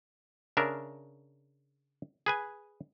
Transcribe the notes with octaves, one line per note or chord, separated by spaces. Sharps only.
C#3 D4 A#4 E5
G#4 B4 G#5